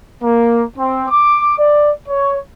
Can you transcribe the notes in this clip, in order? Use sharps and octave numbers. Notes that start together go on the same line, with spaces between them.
A#3
C4
D6
D5
C#5